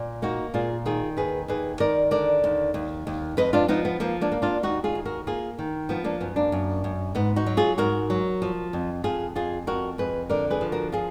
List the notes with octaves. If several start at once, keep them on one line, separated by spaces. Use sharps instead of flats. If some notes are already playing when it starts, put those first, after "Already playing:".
Already playing: A#2
A#3 D#4 F#4
A#2 F4 G#4
D#3 F4 G#4
D#2 G#4 B4
D#2 G#4 B4
D#3 A#4 D5
D3 A#4 D5
D#2
D#2
D#2
F2 B4 D#5
D4 F4
F3 B3 D#4
B3
F3 A#3
A#3 D4
A#3
D4 F4
D#2 D#4 F#4
F4 G#4
D#2
F#4 A#4
A#3 F4 G#4
D#3
F3 B3
A#3 D4
F#2 B3
A#3 D4
F#2
F#2
G#2 B3
D#4 F#4
F#3
F4 G#4
G#2 F#4 A#4
F#3
F3
F2
F2 F4 G#4
F2 F4 G#4
F2 F#4 A#4
F2 G#4 B4
D3 A#4 D5
G#4 B4
F3
F#4 A#4
F4 G#4